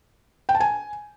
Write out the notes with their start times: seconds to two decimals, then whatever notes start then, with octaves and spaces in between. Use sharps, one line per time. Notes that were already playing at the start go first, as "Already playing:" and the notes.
0.49 G5
0.55 A5
0.60 G#5